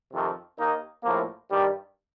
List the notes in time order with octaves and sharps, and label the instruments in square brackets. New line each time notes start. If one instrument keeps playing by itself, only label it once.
[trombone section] F2 C3 D#3
D#2 D#3 A#3 D#4
A#1 A2 F3 A#3
G2 D#3 G3